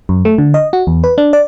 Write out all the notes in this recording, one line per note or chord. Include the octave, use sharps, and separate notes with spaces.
F#2
A3
D3
D#5
F#4
E2
B4
D4
D5